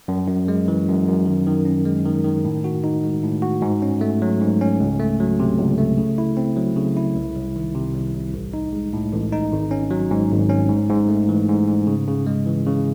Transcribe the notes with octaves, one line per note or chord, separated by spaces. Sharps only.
F#2
F#2
G#3
E3
F#2
F#2
D#3
D#3
C#4
G#3
D#3
D#3
A2
F#4
D#4
G#3
A2
F#4
G#2
C#4
A3
F#3
G#2
C#4
C#2
A3
F#3
C3
C#2
A3
C#3
E4
C4
F#3
C#3
E4
C2
C2
D#3
C3
C2
C2
A1
D#4
G#3
A2
A1
D#4
G#1
C#4
F#3
G#2
G#1
C#4
G#2
G#2
A3
E3
G#2
G#2
C#3
C#3
G#3
E3
C#3